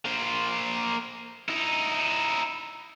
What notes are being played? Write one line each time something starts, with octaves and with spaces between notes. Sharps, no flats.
A#3 C5
D#4 E4